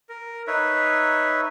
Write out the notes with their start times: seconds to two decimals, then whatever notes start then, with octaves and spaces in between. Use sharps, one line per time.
0.09 A#4
0.47 D#4 B4 C#5 E5